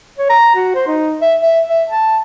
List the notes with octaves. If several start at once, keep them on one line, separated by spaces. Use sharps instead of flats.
C#5
A#5
F#4
C5
D#4
E5
E5
E5
A5